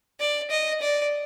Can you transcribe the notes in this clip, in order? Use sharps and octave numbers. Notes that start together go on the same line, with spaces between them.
D5
D#5
D5